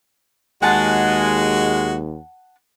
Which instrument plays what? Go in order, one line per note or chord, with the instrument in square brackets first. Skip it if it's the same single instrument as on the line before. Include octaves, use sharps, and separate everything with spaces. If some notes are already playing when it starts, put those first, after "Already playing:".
[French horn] D#2 [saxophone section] G#3 [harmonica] F#4 [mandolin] F#5 A5